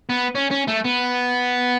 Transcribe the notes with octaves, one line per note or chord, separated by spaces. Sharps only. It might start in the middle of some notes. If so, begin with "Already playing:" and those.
B3
C#4
C#4
A3
B3